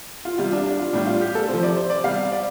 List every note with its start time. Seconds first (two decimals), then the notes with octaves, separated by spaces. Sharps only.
0.25 F4
0.38 C3 G3 F4
0.52 D4
0.66 D4
0.79 F4
0.93 A2 G3 D4
1.07 F4
1.21 G4
1.35 A4
1.48 C3 F3 C5
1.63 D5
1.77 C5
1.90 D5
2.04 C3 G3 F5
2.32 D5